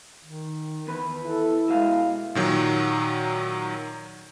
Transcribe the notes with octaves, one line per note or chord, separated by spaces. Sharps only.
D#3
E2 B4
E4 A4
B2 G#3 F5
A#2 D#3 F#3